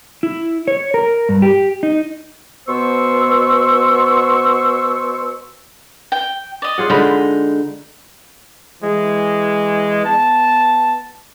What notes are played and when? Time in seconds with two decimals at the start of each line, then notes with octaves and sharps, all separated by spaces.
0.23 E4
0.68 C#5
0.94 A#4
1.29 G2
1.42 G4
1.83 D#4
2.68 B2 B3 C5 C6 C#6 E6
6.12 G5
6.62 D5 D#5
6.78 F4 G#4 F#5
6.90 D3 G#3 D#4 B5
8.82 E3 G#3
10.05 B3 A5